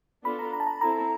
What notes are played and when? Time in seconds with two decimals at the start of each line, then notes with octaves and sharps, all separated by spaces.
0.24 B3 D4 F4 A4 B5
0.39 A#5
0.53 A#5
0.60 A5
0.67 A#5
0.81 C4 E4 A4 A#5